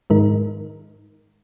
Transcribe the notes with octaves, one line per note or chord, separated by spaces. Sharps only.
G#2 D#3 G#3 D#4 A#4